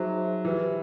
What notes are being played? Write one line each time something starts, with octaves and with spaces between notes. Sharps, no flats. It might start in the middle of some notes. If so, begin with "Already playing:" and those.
Already playing: F#3 D#4 G#4 C5 E5
E3 E4 G4 B4